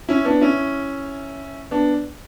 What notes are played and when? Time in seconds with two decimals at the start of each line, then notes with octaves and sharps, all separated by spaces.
0.09 C#4 E4
0.25 B3 D4
0.41 C#4 E4
1.71 B3 D4